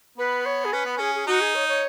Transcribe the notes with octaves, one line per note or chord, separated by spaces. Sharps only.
B3 B4
C#5
G#4
C#4 B4
B3
C#4 G#4
G#4
D#4 F#4
G#4
C#5
C#5